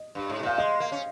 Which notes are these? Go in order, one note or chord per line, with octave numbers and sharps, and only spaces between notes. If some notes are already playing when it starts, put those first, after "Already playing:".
Already playing: D#5
G2
G#2
C3
A#2 F5
G#3 D#5
A#3
C#4